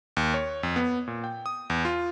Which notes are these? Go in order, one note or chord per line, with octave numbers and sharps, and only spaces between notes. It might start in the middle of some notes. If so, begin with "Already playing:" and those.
D#2
C#5
F2
B3
A#2
G5
D#6
E2
F4